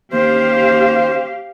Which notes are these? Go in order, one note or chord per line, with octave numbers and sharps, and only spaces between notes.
D#2 C#4 G4 C5 F5